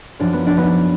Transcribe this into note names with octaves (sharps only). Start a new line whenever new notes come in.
F#2 F3 D4
B3
D4
B3 D4